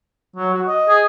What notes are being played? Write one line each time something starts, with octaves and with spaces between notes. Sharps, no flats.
F#3
F#4
D#5
G#4